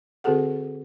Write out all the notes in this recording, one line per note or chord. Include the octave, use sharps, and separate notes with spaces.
D3 C4 F#4 G#4 A4 F#5